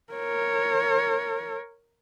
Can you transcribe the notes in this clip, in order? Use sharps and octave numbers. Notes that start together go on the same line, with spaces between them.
A#4 C#5